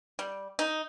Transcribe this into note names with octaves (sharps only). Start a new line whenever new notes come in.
G3
D#4